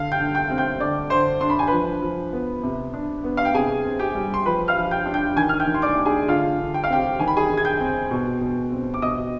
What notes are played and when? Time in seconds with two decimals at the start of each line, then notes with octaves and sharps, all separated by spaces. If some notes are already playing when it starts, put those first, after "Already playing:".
Already playing: D3 F5 F6
0.12 G5 G6
0.20 D3
0.35 G5 G6
0.50 C4
0.58 G5 G6
0.80 D3 D5 D6
1.10 D3 C5 C6
1.41 D4 C6
1.50 B5
1.59 G#5
1.68 F3 B4 B5
2.02 F3
2.33 B3
2.63 C3
2.94 D4
3.24 B3
3.37 F5
3.45 G5
3.54 C3 G#4 G#5
3.85 C4
3.99 G4 G5
4.15 G3
4.34 C6
4.45 F3 B4 B5
4.68 F5 F6
4.76 F3
4.91 G5 G6
5.06 D4
5.14 G5 G6
5.37 D#3 G#5 G#6
5.49 F6
5.60 G5 G6
5.67 D#3
5.74 C6
5.82 D5 D6
5.98 D4
6.05 G#4 G#5
6.28 D3 F4 F5
6.59 D3
6.74 G5
6.84 F5
6.90 C4 G4 G5
7.19 D#3 G#5
7.28 B5
7.37 G#4 G#5
7.50 D#3
7.57 G#6
7.65 G5 G6
7.80 C4
8.11 B2
8.41 B2
8.72 C4
8.94 D6
9.02 B2 D#5 D#6